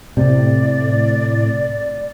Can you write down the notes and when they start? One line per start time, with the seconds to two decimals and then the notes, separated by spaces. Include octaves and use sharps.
0.17 A2 C3 D5